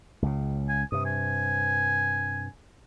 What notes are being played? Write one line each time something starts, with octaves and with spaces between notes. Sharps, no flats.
C#2 C#3
G#5
G2 C3 D#6
G#5